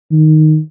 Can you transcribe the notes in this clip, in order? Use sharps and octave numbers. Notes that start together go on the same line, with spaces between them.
D#3